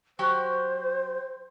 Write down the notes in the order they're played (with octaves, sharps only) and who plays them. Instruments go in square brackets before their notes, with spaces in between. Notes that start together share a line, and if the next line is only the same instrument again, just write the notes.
[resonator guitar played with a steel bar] F#3 F#4 G4 [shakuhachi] C5